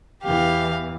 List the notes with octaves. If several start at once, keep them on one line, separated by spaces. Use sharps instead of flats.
E2 E3 G4 F5